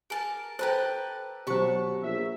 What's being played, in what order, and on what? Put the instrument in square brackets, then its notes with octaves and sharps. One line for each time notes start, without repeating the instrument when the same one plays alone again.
[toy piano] G#4 G#5 [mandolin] A#4 A5
[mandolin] G4 B4 A5 [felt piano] A4 A#5 [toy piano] C5
[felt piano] B2 F#3 [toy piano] G4 C5 [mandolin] A5 B5 C#6
[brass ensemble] A#1 E5